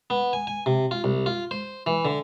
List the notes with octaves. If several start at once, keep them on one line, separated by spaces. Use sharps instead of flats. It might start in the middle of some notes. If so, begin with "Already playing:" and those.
B3
G#5
G#5
C3
F4
C2
F4
C5
E3
D3